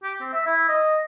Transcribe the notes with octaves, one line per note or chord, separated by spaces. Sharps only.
G4
C4
E5
E4
D#5